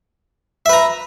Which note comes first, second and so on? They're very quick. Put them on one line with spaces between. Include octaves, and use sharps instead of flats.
E5 B4 A#5